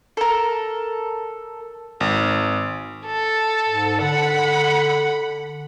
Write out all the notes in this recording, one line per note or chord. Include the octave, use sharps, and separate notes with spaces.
A4 A#4
G#1
A4
G#2
D3 F#5 B5